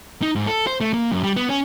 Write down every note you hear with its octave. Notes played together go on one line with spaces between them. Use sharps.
D#4
G#2
A4
C5
A3
A#3
F#2
G3
B3
C#4